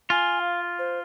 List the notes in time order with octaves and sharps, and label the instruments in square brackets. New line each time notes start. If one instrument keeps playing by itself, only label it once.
[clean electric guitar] F4 [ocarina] G#5
[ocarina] F5
C5